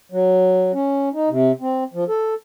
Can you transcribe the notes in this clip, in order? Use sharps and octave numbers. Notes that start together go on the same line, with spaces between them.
F#3
C#4
D#4
C3
C4
F3
A4